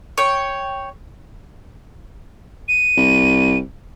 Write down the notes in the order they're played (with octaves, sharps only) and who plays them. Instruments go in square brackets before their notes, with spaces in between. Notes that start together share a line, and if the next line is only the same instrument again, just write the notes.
[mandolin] C#5 G5
[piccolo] D#7
[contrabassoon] C2